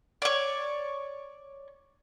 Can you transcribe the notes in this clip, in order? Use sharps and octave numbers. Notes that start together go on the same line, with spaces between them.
C#5 D5